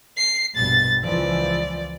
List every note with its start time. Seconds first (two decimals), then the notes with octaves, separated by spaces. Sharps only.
0.17 C7
0.56 A#1 G2 B2 A6
1.04 C#2 E3 F3 D5